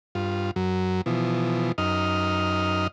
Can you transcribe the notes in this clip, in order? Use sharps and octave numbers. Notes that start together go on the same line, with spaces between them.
G2 F4
F#2 F#3
B2 E3 F3
F#2 D#4 D#5 F6